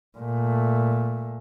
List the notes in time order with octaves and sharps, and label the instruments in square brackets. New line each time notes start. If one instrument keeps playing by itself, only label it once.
[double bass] A#2 A3